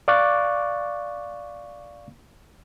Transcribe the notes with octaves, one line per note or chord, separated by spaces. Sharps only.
D5 F5 C#6 D6 F#6 A6